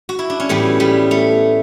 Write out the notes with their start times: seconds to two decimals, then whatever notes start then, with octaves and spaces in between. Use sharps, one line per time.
0.09 F#4
0.19 E4
0.30 D4
0.40 C#4
0.49 A2 E3 G3 B3
0.80 G3 B3
1.11 A3